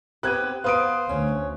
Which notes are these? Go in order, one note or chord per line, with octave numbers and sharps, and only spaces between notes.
B3 C4 G4 F#6 G#6 D#7
B3 C5 F5 D#6 D7
D2 C#4